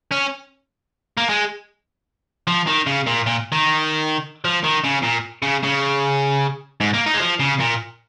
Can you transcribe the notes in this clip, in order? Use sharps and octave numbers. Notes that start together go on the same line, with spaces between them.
C#4
A#3
G#3
F3
D#3
C#3
A#2
A#2
D#3
F3
D#3
C#3
A#2
C#3
C#3
G#2
A#3
D#4
G#3
F3
C#3
A#2